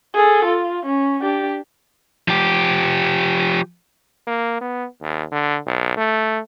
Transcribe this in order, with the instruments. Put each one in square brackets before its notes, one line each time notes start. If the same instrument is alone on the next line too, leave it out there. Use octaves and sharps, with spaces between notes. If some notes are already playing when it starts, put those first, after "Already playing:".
[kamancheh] G#4 A4
F4
C#4
D4 G4
[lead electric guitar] F3 G4
[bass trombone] A#3
B3
D#2
D3
B1
A3